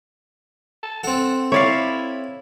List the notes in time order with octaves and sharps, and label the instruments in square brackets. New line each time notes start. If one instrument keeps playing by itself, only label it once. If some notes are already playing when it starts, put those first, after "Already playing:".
[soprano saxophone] A5
[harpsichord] C4 A4 [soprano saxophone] F#5
[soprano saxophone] E4 [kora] C#5 D5 F5